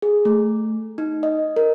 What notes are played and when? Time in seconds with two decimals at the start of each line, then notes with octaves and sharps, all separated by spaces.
0.02 G#4
0.25 A3
0.98 D#4
1.23 D#5
1.56 A#4